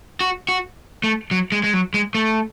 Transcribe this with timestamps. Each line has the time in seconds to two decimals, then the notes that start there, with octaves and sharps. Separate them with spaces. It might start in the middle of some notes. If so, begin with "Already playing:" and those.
0.21 F#4
0.49 F#4
1.04 A3
1.31 F#3
1.52 G#3
1.64 G#3
1.73 F#3
1.94 G#3
2.15 A3